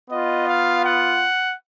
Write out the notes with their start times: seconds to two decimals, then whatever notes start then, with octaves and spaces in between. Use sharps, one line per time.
0.10 B3 F4 D#5
0.48 F5
0.84 F#5